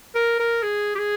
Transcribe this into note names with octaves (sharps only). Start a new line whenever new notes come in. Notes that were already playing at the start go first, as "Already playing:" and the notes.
A#4
A#4
G#4
G4
G#4